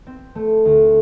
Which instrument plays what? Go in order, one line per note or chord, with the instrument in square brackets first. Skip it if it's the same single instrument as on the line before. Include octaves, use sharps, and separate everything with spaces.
[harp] C4
A3
D2